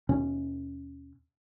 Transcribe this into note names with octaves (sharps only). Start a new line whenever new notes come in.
D#2 B2 C#4